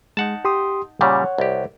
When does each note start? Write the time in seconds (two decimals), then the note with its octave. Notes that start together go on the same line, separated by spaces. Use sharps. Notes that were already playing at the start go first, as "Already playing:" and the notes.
0.17 G#3 D#4 F#5 A5
0.45 G4 C6 D#6
1.01 A#2 C#3 G3 C#5 F#5
1.38 C2 G4